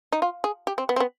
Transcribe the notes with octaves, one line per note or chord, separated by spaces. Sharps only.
D#4
F4
G#4
G4
C4
B3
C4
B3